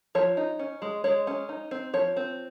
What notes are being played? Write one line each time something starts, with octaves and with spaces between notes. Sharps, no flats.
F3 C#5
D#4
C#4
G#3
G#3 C#5
C#4
D#4
C4
F3 C#5
C4